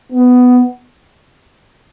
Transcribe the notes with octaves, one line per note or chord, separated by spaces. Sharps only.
B3